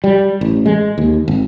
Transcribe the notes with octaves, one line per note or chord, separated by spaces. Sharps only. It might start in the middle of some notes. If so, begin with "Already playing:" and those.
G3
A1
G#3
D#2
G#1